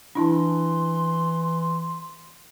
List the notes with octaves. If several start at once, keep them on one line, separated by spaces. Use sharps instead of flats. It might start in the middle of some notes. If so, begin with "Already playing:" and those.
E3 D4 E4 A5 C6